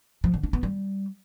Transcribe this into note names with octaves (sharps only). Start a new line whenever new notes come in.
F3
D3
D4
B3
G3